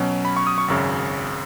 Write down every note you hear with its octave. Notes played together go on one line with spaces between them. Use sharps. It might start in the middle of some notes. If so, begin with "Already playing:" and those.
Already playing: B2 F#3 C#4
B5
C#6
D#6
C#6
G#1 F#2 C#3